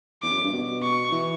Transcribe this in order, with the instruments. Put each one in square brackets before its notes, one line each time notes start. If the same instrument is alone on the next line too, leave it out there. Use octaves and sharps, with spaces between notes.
[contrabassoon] E2 [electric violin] D6
[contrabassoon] F#2
G2
B2
[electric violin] C#6
[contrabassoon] E3